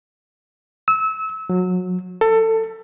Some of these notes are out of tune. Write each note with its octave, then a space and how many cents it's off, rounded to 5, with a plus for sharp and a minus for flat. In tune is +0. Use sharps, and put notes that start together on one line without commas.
E6 -25
F#3 -25
A4 +20